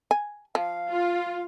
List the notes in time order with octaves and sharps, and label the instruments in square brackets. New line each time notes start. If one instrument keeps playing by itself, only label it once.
[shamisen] G#5
[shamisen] F3 [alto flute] F5
[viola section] F4